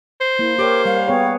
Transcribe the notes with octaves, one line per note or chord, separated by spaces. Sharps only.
C5
A#3 E4
G4 A#4 C#5 D6
G3 F5
B3 G#4 C#5 G5